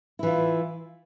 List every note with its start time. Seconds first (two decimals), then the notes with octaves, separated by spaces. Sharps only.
0.19 E4
0.23 E3
0.27 F4